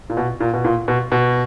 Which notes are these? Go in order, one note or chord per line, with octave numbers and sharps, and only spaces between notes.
A#2
B2
A#2
B2
A#2
B2
B2